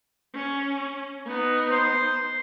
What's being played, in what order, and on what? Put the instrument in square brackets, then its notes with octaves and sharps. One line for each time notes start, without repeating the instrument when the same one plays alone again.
[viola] C#4
B3 D#4
[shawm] C5